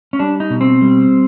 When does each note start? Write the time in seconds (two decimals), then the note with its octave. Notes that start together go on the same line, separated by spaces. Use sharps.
0.13 C#4
0.19 G3 D4
0.40 D#4
0.50 B2
0.61 C4
0.82 G3